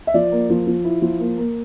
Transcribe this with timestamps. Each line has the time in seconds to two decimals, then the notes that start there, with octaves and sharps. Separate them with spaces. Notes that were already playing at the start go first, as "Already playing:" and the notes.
0.07 E5
0.14 F3 D5
0.32 A#3
0.50 F3
0.67 F3
0.84 E4
1.02 F3
1.20 A#3
1.37 A#3